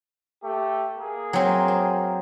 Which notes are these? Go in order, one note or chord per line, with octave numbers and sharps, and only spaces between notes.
A3 G4
A#3 G#4
F#3 C4
C5